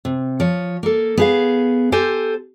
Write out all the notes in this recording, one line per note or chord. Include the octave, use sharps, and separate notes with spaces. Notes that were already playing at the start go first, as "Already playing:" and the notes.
C3
F3 C#5
A#3 A4
B3 G#4 F5
G4 A4 C5 G#5